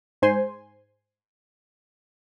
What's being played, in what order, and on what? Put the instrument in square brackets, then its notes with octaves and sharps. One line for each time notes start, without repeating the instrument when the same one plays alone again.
[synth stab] G#2 C5 G#5 C6